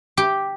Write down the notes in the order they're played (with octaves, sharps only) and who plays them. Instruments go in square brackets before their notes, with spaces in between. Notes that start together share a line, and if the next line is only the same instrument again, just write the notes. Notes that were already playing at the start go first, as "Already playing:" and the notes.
[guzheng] G4